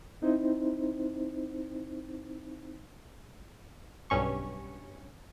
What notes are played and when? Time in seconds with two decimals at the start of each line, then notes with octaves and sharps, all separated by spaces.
0.22 C4 D#4 E4 C5
4.10 B1 G2 C#4 C#6